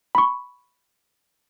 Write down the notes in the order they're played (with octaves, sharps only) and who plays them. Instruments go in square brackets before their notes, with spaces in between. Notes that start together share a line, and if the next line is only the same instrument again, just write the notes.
[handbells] B5 C#6